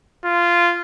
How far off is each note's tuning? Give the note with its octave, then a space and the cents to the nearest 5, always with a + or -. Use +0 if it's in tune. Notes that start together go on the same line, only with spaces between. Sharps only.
F4 -15